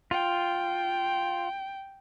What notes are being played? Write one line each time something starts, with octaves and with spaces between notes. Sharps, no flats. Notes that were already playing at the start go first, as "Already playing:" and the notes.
F4 G5